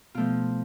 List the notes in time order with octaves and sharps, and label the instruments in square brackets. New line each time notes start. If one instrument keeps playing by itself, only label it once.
[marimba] B2 B3 [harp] F3 A3 F4